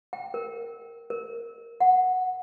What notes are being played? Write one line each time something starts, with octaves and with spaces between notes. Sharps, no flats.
G5
A#4
A#4
F#5